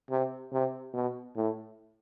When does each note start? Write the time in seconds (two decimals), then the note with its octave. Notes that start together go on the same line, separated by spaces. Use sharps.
0.10 C3
0.52 C3
0.94 B2
1.36 A2